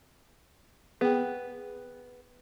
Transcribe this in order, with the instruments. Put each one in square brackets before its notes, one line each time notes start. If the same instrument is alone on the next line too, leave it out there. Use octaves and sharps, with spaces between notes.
[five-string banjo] B3 [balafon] G#4 G5